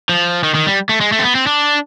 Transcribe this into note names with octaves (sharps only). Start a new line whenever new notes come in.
F3
D#3
D#3
G3
A3
G#3
A3
C4
B3
C4
D4